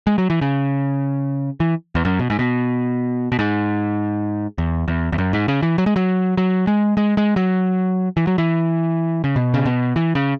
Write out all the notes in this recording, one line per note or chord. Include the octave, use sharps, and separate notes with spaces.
G#3
F#3
E3
C#3
E3
E2
F#2
B2
G#2
B2
B2
G#2
E2
E2
E2
F#2
G#2
C#3
E3
F#3
G#3
F#3
F#3
G#3
G#3
G#3
F#3
E3
F#3
E3
C#3
B2
C#3
B2
E3
C#3